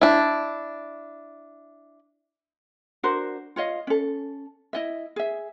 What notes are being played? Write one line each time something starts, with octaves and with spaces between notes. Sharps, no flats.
D4 E4
D4 F#4 A#4 C5
F4 C#5 D#5 F5
C#4 A4
E4 D#5 E5
G#4 E5